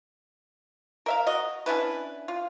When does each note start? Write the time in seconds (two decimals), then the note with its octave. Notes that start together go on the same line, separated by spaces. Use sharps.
1.06 A#4 E5 F5
1.27 F#4 D#5
1.66 C#4 D4 E4 B4
2.28 F4